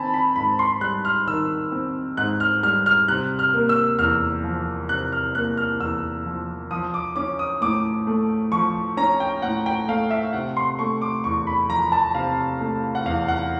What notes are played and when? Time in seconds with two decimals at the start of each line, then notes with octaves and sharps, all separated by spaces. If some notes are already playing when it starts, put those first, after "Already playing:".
Already playing: D#3 C4 G#5 A5 B5
0.14 B5
0.36 G#2 B5
0.59 C6
0.81 G3 F#6
1.05 F6
1.27 D#3 E6
1.72 C4
2.17 G#2 F#6
2.40 F6
2.63 G3 F6
2.86 F6
3.08 C3 F#6
3.39 F6
3.54 A#3
3.69 E6
3.99 E2 F6
4.44 F3
4.89 C3 F#6
5.12 F6
5.34 A#3 F#6
5.57 F6
5.80 E2 E6
6.26 F3
6.71 F3 D#6
6.94 D6
7.16 C#4 D6
7.39 D#6
7.61 A2 D6
8.07 A3
8.52 F3 C#6
8.97 C#4 A#5
9.20 G5
9.42 A2 F#5
9.66 G5
9.88 A3 F5
10.11 E5
10.33 C3 F#5
10.57 C6
10.79 A3 C#6
11.02 D6
11.24 E2 C#6
11.47 B5
11.70 F3 A#5
11.92 A5
12.15 C3 F5
12.60 A3
12.95 F#5
13.05 E2 F5
13.28 F#5